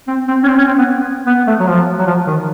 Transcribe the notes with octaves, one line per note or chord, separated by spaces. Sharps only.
C4
C4
C#4
C4
C#4
C4
B3
B3
A3
F#3
F3
F#3
F3
D#3